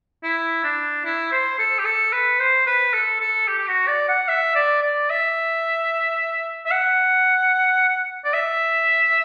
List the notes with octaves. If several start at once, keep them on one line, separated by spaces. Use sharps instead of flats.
E4
D4
E4
C5
A4
G4
A4
B4
C5
B4
A4
A4
G4
G4
F#4
D5
F#5
E5
D5
D5
E5
E5
F#5
D5
E5